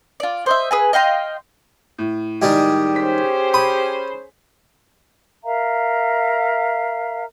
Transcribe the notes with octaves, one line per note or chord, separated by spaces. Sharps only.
F4 D5
C5 D#5 E5
G#4 B4 G#5
D#5 F5 G5 C6
A2
D#3 G3 G#3 G4
C#4 G#4 C5 B6
B5 D#6
A#4 E5 F5 A#5